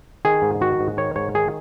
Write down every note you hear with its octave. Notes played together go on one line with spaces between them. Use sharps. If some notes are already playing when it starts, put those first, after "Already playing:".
D#3 G#4
G#2
D#3 F#4
G#2
D#3 C#5
G#2 C#5
D#3 G#4